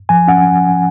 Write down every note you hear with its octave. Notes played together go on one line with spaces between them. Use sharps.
F3 G#5
C#4 F#5